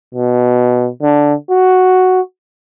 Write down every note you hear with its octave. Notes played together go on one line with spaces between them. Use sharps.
B2
D3
F#4